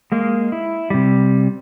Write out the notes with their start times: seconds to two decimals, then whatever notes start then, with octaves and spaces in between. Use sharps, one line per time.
0.12 G#3 A#3
0.52 E4
0.90 C3 G3